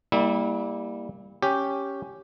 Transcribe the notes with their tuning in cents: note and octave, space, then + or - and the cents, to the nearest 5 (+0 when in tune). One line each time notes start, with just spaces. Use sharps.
G3 +15 A#3 +0 E4 -30
C#4 +0 G4 +0